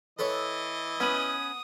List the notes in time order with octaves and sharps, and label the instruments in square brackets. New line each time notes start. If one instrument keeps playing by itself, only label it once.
[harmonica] E3 D#5 [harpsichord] A4 B4 C#5
[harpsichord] B3 [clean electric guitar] C#4 B4 [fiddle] D#6